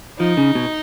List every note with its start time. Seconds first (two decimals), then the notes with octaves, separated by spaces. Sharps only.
0.19 F3 D#4
0.37 C#3
0.55 B2